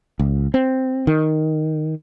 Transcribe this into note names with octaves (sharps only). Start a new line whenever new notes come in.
C#2
C4
D#3